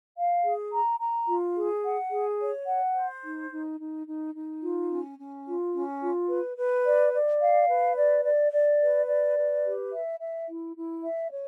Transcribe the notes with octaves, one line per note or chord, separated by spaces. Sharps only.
F5
G#4
A#5
A#5
F4
G#4
F#5
G#4
C#5
F#5
C5
D#4
D#4
D#4
D#4
D#4
F4
C#4
C#4
F4
C#4
F4
B4
B4
D5
D5
F5
B4
D5
D5
D5
B4
D5
B4
G4
E5
E5
E4
E4
E5
C#5